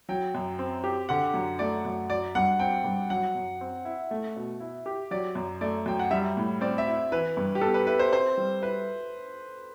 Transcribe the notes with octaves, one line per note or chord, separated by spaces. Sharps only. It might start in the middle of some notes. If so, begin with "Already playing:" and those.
F#3 G5
F#2
C4
G4
D3 F#5
F#2
A3 D5
F#2
F#3 D5
G2 F#5
C4 G5
G2
F#3 F#5
F#2
C4
E4
A3
B2
E4
G4
F#3 D5
F#2
A3 D5
F#2 G5
F#5
G3 E5
A2
C4 D5
E5
E4
E3 B4
G2
G4
B3 A4
B4
E4 B4
C5
C4 C5
G3
E4 B4